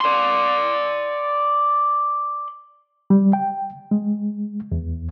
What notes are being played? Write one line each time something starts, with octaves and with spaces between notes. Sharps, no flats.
D5 C6
G3
G5
G#3
E2